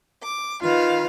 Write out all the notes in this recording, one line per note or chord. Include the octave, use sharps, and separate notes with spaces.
D6
D#3 F4 B4 F5